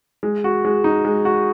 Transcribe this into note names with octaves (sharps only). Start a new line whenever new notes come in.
G#3
F#4
G#3
D#4
G#3
F#4